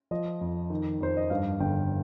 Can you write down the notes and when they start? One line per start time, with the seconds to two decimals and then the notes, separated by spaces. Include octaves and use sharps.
0.11 F3 D#5
0.41 F2
0.70 D#3
1.01 F2 C5
1.17 D#5
1.30 G2 F5
1.60 G1 G5